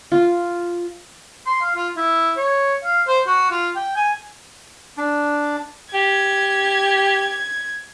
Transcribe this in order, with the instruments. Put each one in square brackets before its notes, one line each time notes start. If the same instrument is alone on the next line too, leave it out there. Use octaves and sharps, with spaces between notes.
[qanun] F4
[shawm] C6
F5
F4
E4
C#5
F5
C5
F#4
F4
G5
G#5
[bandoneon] D4
[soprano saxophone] G4 [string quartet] G#6